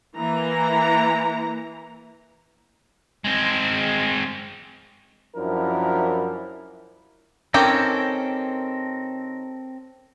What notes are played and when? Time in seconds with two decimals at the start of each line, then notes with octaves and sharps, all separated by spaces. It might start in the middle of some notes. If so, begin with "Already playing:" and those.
0.17 E3 A#3 A#5
3.24 G#3 C4
5.36 F#2 F3 D4 E4 A#4
7.54 D#3 C4 C#4 G4 A4 A#4